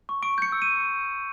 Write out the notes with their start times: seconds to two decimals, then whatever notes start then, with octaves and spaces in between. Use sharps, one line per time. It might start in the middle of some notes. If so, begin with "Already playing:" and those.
0.09 C#6
0.22 C#6 D7
0.38 G6 C#7
0.52 E6
0.62 D#7